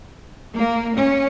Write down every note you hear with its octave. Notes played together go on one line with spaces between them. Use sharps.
A#3
C#4